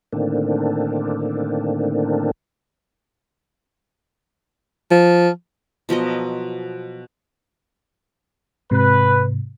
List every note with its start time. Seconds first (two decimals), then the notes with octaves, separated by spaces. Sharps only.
0.13 A2 D3 D#3 A#3 C4 D4
4.91 F3
5.89 B2 F3 F#3 D#5
8.71 G#2 C3 B4